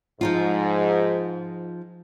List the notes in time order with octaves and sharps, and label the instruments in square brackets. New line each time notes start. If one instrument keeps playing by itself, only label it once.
[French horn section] G#2 [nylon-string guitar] F3 D#4 F4